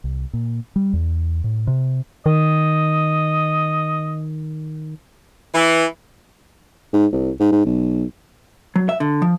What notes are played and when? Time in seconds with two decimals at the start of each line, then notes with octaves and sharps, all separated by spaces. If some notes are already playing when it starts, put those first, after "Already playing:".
0.04 C2
0.33 A#2
0.76 G3
0.93 E2
1.44 A2
1.67 C3
2.26 D#3 D#5
5.54 E3
6.93 G#2
7.12 C2
7.40 G#2
7.52 G#2
7.65 B1
8.76 F#3
8.89 E5
9.00 D3
9.22 F3